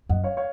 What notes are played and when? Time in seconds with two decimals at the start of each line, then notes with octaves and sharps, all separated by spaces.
0.09 F#2 D#5 F#5
0.24 C#5 F5
0.37 C#5 F5